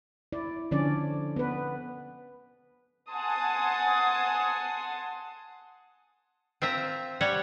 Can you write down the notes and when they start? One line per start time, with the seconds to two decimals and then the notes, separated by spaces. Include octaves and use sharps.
0.32 E4 D5
0.71 D3 F3 C#4 D4 D5
1.36 B3 B4
3.10 F#5 G#5 A5 C6 D#6
6.62 C4 F4 E5 A#5
7.21 G3 C#5 F#5